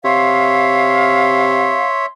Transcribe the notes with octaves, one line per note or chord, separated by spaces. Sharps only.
C3 C#5 E5 F5 C6